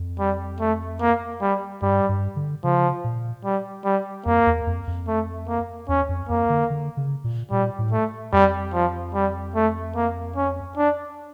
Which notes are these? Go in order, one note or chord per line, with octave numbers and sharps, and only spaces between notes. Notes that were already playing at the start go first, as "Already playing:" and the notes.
Already playing: F2
G3
A3
A#3
G3
G2 G3
G2
D3
C#3 F3
A#2
G3
G3
F2 A#3
E2
F2
F2
A3
A#3
E2 C#4
F2
F2 A#3
D3
D3
C#3
A#2
A#2 G3
A2
A3
F2 G3
F3
G3
A3
A#3
C#4
D4